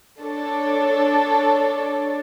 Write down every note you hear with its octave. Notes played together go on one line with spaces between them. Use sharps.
D4 A4 C#5